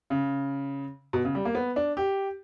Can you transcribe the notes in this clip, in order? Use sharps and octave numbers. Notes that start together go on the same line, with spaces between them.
C#3
B2
C#3
G3
A#3
B3
D4
G4